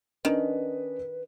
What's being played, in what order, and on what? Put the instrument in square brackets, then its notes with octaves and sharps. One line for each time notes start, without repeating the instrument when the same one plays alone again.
[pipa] D#3 [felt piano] C#4 D4 D#5 [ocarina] B4